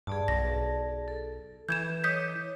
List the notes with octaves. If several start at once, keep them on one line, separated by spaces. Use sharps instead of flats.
G2 G#4 D5 A5
B1 A#6
A4
E3 G6 G#6 E7
C#5 D#5 D6 D#6 G6 B6